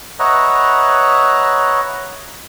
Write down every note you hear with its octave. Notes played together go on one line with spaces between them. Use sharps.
B4 C#5 D#5 E5 F#5 A#5